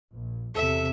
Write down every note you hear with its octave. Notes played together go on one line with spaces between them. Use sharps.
A#1
E2 C3 A4 E5